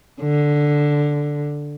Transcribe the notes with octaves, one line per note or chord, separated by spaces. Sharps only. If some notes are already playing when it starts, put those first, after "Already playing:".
D3